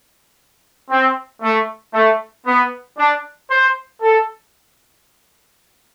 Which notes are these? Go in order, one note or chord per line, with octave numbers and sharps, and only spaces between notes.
C4
A3
A3
B3
D4
C5
A4